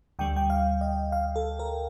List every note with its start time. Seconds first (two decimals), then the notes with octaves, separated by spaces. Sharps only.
0.19 D2 D3 G3 G5
0.36 G5
0.50 F5
0.81 D#5
1.12 F5
1.36 A4
1.59 A#4